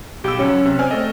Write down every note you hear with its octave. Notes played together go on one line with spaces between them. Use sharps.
B1 G4 E6
C#2 F#3 C#4
C3
C4 D5 G#5 F6
A3 A4 D#5